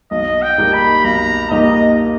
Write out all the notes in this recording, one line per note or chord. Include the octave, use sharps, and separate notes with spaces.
B1 D#5
G5
A#2 G3 A#3 D#4
B5
B1 A#5
A#2 G3 A#3 D#4 D#5